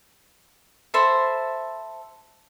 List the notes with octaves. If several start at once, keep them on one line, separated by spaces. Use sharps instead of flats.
A4 C5 E5 B5